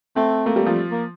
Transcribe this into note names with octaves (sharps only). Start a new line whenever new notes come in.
A3 C4
A3 A#3
G3
F3
A#3